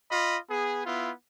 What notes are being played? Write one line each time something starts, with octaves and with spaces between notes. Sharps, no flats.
F4 D#5 B5
B3 G#4
B3 E4 F4